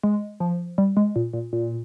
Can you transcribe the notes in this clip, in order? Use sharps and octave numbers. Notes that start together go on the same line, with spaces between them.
G#3
F3
G3
G#3
A#2
A#2
A#2